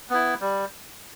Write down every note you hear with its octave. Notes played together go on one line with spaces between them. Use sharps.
B3 E4
G3